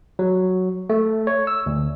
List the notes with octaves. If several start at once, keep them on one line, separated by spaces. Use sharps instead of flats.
F#3
A3
C#5
E6
D2